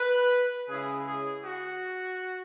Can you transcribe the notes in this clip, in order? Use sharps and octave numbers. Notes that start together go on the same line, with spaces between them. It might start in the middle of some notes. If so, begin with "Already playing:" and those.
Already playing: B4
C#3 G#3 C#4 E4 G#4
G#4
F#4